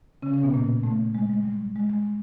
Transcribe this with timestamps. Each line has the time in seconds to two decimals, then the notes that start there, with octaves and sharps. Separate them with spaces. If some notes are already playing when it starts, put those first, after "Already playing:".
0.22 C#3 C#4
0.33 C#3 C#4
0.43 B2 B3
0.54 A#2 A#3
0.83 A2 A3
1.15 G#3
1.30 G#3
1.44 G3
1.76 G#3
1.90 G#3